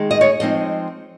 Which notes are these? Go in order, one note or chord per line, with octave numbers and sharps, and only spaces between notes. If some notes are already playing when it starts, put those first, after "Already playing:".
Already playing: D#3 G#3 D#4
D#5
C#5
F3 G#3 C4 D#4 D#5